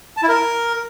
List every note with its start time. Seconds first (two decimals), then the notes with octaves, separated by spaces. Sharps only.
0.17 A5
0.23 E4
0.29 A#4